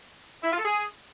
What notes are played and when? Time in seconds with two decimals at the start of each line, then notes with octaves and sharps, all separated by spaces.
0.44 E4
0.51 F4
0.58 A4
0.65 G#4